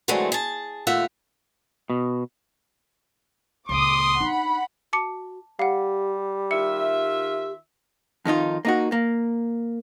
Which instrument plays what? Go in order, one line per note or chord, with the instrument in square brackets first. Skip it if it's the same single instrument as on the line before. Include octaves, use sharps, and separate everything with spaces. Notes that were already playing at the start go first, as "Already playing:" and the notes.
[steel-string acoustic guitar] D3 E3 F#3 G#3 A3 C4
G#4 A5
D#2 A#2 A3 F4 E5 F#5
[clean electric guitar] B2
[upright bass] C#2 A#2 [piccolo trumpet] C6 [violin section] D6 D#6
[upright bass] D4 D#4 [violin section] F#5 B5
[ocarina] F#4 [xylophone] A5 D6 C#7
[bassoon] G3 [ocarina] G4 [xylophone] F5 F#5
[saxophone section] D#3 F4 E5 [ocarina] G4 [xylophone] C#7
[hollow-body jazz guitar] F2 D#3 D#4 F4
A#3 D#4 F#4
A#3